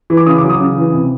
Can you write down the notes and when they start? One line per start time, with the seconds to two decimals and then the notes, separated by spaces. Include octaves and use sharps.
0.10 E3
0.17 D6
0.26 C#3 D#6
0.38 D6
0.43 F#3
0.50 D#6
0.60 C#3
0.78 E3
0.94 C3